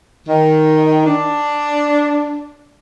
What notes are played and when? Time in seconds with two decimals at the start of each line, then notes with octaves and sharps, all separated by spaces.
0.27 D#3
1.06 D4